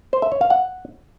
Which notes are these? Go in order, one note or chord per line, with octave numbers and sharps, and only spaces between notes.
C5
E5
C#5
F5
F#5